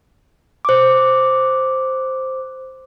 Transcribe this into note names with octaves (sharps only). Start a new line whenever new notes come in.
C5 D6